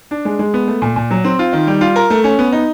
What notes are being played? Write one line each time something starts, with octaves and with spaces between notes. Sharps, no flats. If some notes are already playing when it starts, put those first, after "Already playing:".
D4
G#3
G#3
B3
A3
A#2
A#2
F#3
C4
F4
D#3
G3
F4
A#4
A3
C#4
B3
D#4